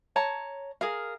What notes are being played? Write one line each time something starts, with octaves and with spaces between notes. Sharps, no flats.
C#5 A5 A#5
G#4 A#4 F5